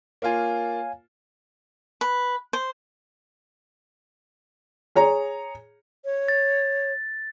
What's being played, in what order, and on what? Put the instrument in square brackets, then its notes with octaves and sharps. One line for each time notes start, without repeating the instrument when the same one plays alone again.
[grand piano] A#3 F4 [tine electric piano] C#5 F5 G#5
[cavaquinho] B4
C5
[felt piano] G#4 C#5 A#5
[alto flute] C#5
[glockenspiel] A6